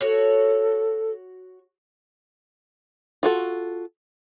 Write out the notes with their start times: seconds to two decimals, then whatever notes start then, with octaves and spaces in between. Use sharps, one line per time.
0.01 F#4 A4 C#5
3.23 F4 F#4 A4